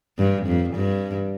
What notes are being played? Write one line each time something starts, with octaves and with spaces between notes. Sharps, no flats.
G2
F2
G2